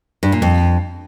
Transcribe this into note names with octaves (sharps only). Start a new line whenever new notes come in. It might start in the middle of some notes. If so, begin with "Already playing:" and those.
G2
A#2
F2